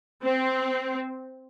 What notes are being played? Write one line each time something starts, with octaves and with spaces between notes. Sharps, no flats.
C4